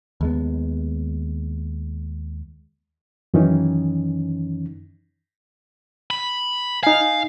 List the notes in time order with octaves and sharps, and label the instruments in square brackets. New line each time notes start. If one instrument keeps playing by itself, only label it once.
[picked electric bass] D#2 G#3 B3
[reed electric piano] F#2 D#3 E3 C#4 D#4
[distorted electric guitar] B5
[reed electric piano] D#4 G#5 [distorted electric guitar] F5